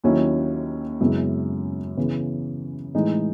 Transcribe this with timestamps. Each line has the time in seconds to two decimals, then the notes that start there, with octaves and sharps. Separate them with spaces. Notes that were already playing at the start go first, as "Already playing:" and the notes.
0.04 D#2 D#3 F#3 C#4 E4
1.01 F#2 C#3 G#3 B3 E4
1.97 C#3 E3 B3
2.94 A2 E3 G#3 D#4